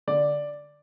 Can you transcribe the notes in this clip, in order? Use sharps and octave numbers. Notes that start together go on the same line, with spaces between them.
D3 D5